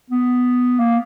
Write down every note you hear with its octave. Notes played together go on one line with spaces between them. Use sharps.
B3
A#3